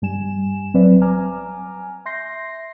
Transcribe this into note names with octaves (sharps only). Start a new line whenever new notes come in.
G2 G3 G#5 E7
A1 F#3 C4 B4 D5 E5
G#5 A#5 D6 F6
E5 C6 G6 A#6 C7